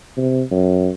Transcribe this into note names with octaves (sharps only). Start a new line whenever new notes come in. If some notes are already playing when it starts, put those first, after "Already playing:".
C3
F#2